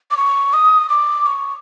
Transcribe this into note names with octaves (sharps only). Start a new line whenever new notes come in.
D6
C#6
D#6
D6
C#6